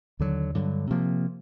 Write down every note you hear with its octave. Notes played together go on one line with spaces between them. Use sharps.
D#2 D3 F#3
G2 D3 F#3
C3 F3 A#3